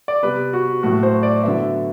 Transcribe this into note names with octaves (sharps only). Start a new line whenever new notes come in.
D5
C3 G3 B3 B4
F#4
A2 F#3 A3 F#4
C5
D5
D3 F#3 B3 E5